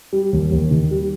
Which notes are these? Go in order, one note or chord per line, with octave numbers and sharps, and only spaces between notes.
G3
D#2
D#2
D#3
G3